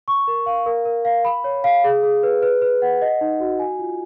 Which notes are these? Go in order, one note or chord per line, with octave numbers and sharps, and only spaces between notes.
C#6
A#4
F5
A#4
A#4
F5
B5
C#5
F5
G#4
G#4
B4
B4
B4
F#5
D#5
D#4
F#4
G#5
F4